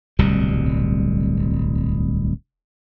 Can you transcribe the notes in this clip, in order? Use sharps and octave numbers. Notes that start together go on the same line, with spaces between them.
D1 C2 B2 G3